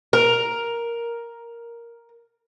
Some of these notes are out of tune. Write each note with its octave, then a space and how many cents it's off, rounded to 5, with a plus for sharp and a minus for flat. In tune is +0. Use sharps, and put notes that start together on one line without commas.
A#4 +5